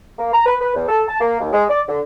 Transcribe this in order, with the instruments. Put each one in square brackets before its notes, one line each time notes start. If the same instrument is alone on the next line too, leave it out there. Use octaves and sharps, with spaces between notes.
[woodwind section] A#3
A#5
B4
B4
E2
A4
A5
A#3
D#2
G#3
D5
D3